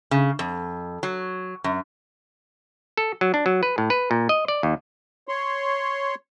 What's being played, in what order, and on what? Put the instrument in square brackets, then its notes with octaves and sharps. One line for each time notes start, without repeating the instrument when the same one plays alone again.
[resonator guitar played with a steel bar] C#3
F2
F#3
F#2
[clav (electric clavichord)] A4
F#3
D4
F#3
B4
A2
B4
A#2
D#5
D5
D#2
[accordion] C#5 C6